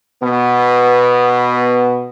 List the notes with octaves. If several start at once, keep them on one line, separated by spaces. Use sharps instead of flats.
B2 B3